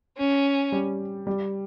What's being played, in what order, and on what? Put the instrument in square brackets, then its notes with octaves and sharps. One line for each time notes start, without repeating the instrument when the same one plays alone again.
[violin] C#4
[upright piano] G3
G3